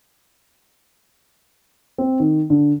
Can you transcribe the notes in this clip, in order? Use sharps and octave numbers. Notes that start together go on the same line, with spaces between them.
C4
D#3
D3